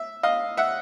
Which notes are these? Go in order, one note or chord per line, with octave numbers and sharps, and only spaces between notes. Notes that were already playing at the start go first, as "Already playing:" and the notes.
Already playing: E5
D#5 F5
E5 F#5